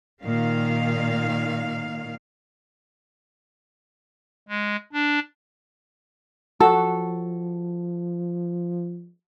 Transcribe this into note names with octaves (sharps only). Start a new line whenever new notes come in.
A#2 D#3 F5
G#3
D4
F3 F#4 A4 E6